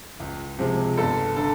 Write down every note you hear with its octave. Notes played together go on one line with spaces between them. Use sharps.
C#2
C3 F3 G#3
G1 A4
D3 A4